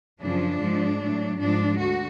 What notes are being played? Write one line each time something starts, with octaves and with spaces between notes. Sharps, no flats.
F#2 C#3 F3 D4
G#2 F3 G#3
A2 F#3
G#2 F3 G#3 D4
D2 D3 F#4